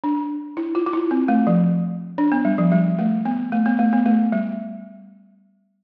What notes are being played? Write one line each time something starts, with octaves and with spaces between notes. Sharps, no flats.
D4
E4
F4
F4
E4
C4
A3
F3
D4
B3
G3
F3
G3
A3
B3
A3
B3
A3
B3
A3
G3